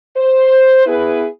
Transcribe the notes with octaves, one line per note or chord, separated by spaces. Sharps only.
C5
B3 E4 G#4 B4